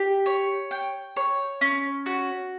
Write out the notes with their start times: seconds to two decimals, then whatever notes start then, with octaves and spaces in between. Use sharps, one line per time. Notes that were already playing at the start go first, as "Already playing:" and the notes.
Already playing: G4
0.26 C#5
0.71 G5
1.17 C#5
1.61 C#4
2.06 F#4